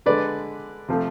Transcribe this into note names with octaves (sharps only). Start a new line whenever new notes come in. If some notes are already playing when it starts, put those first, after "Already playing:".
D3 G#3 B4 D5
C3 F3 A3